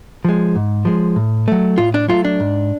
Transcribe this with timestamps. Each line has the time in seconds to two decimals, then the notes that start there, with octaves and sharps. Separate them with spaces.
0.25 F3 G#3
0.56 G#2
0.85 F3 G#3
1.16 A2
1.48 F#3 A3
1.78 A2 F4
1.94 D4
2.08 F#3 A3 F4
2.25 D4
2.40 G#2